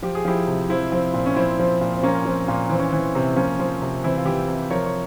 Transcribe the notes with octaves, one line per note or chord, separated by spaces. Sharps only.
F3 G4
G#4
F3 E4 G4
C3
F3 C4 E4
F3 C4
A#2 C4
C#4
F3 C4 E4
F3
A#2
C4
F3 A#3 C#4
F3 C4
A#2 A#3
E3 C4
C#4
E3 C4
C3
F3 A#3 C#4
F3 C4
C3
E3 C4 E4
F4
E3 E4 G4
C3
F3 A#4 C#5
C#5